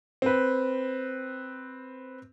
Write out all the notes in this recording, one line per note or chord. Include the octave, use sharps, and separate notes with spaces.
C4 B4